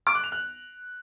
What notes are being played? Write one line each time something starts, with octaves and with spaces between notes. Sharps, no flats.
D6
F#6
F7
F#6